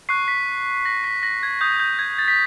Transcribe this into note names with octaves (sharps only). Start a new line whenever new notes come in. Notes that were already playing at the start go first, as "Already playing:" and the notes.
C#6 F#6 C7
B6
A#6
B6
A#6
G#6
D#6 G6
G6
G#6
A6
B6